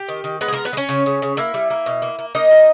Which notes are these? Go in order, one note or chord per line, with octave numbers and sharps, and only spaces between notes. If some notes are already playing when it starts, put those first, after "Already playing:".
Already playing: G4 G5
D#3
D#3
G#3 B3 B4
G#4
A#3 B3 A#4
B3 B4
G#3
C#4 C#5
C#3
C#3
C#3
A#3 E4 E5
G3
A#3
B2
A#3
A#3
A#3 D#4 D#5
G3